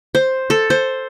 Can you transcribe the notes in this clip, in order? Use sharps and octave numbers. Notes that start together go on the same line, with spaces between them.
C5
A4
C5